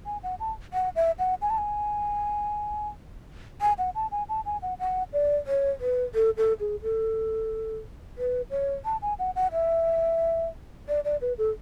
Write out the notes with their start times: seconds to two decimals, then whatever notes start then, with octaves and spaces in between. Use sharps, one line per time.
0.06 G#5
0.23 F#5
0.40 A5
0.74 F#5
0.96 E5
1.19 F#5
1.42 G#5
1.50 A5
1.58 G#5
3.61 G#5
3.78 F#5
3.95 A5
4.12 G#5
4.29 A5
4.46 G#5
4.62 F#5
4.80 F#5
5.13 D5
5.47 C#5
5.81 B4
6.15 A4
6.37 A4
6.60 G#4
6.83 A4
8.18 B4
8.51 C#5
8.85 A5
9.02 G#5
9.19 F#5
9.36 F#5
9.52 E5
10.88 D5
11.05 D5
11.21 B4
11.38 A4